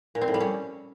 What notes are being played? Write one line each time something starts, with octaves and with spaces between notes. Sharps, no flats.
A#2
C4
A2
G3
C#4